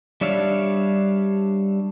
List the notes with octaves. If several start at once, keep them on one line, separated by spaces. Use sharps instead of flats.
G3 D4 C#5 E5 F5